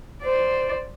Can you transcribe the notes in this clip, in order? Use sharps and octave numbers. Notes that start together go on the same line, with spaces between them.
C5 D5